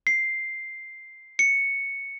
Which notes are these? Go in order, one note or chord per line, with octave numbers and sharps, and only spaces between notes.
C7
C#7